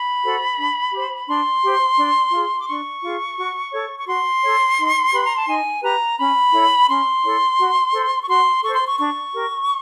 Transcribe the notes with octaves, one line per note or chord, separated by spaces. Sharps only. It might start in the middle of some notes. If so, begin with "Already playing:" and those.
Already playing: B5
F#4 A4 C5
D4
G4 C5
D4 C6
G4 C5
D4
F4 G#4
D6
D4 C#6
F4 G#4
F#4
A4 C#5
C#6
F#4 C6
A4 C#5
D#4
G4 B4 B5
A#5
A5
D#4 G#5
G4 B4 A#5
C#4 B5
E4 A4 C#5
C#4 C6
E4 A4 C#5
F#4
A4 C5
C#6
F#4 C6
A4 C5 C#6
C6
C#6
D4 C#6
G4 A#4